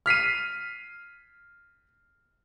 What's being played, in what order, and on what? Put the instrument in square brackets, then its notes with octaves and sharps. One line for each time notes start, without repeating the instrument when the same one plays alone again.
[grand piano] F6 B6 C7 D#7